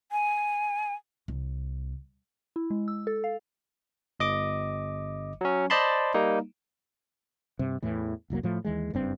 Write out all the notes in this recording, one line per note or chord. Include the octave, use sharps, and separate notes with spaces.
G#5
C2
E4
G#3
E6
A4
F5
G1 D#5 D6
F#3 C#4
C5 D5 D#5 A5 B5 C6
G3 A#3 D#4
G2 C3
E2 A2 E3
F1 C2 F#3 A#3
A2 F3 G3 A3
D#2 E3 G#3
F#1 G2 C4